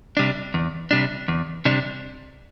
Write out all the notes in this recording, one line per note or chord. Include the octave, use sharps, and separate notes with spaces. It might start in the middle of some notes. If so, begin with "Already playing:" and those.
C3 G3 D4
E2
C3 G3 D4
E2
C3 G3 D4